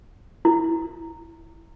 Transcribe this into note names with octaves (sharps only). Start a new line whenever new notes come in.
E4